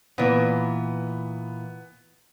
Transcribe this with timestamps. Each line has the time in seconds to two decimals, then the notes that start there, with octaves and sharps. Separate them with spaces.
0.18 A#2 E3 B3